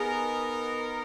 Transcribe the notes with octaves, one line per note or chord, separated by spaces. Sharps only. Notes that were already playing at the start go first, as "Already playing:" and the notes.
Already playing: B3 D#4 G#4 A#4 D#5